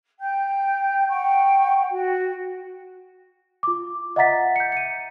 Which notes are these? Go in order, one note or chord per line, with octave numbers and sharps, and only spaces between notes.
G5 G6
F#5 G5 C#6
F#4
F4 D6
D#5 E5 F#5 A#5 A6 B6
G6 C#7
C#7 D#7